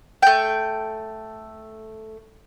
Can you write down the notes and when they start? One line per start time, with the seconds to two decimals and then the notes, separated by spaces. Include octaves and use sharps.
0.22 A3 G5